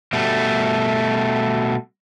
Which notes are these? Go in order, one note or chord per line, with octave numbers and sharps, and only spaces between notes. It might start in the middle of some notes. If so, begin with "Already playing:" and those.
B2 G3 A3